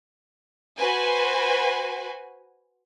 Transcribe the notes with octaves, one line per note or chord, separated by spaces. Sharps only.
F#4 B4 C5 G#5